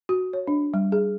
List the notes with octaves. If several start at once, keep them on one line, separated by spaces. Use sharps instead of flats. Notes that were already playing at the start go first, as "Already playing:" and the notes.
F#4
C#5
D4
G3
G#4